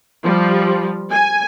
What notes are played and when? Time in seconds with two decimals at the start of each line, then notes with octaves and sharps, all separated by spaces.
0.24 F3 G3
1.10 G#5